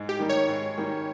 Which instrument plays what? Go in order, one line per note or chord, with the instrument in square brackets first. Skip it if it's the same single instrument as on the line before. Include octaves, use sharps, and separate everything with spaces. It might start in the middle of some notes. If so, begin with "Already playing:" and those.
Already playing: [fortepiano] G#2
[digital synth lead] G4
[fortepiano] D#3 G3 A#3 D#4
[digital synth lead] C#5
[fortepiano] G#2
D#3 G3 A#3 D#4